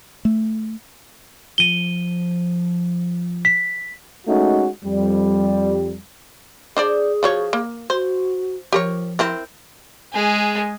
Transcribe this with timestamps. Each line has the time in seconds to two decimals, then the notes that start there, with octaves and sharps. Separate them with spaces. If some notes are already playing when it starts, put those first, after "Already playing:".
0.25 A3
1.58 F3 D#7 G7
3.45 B6
4.28 G#3 A3 C#4 D#4 F#4
4.84 F2 G3
6.77 D4 G#4 C5 D5
7.23 F3 F#4 C#5
7.53 A#3
7.90 F#4 C5
8.73 F3 G4 A#4 C#5
9.19 C4 E4 A#4
10.13 G#3 G#4